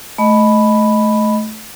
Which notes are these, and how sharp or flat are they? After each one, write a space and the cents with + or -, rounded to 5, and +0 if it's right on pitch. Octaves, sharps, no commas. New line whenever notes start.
A3 -20 D#5 +0 B5 +0